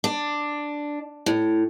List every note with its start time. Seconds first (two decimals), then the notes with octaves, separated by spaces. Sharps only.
0.04 D4
1.26 A2